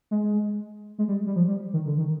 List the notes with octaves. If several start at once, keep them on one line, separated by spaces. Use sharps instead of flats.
G#3
G#3
G3
G3
F3
G3
D#3
D3
D#3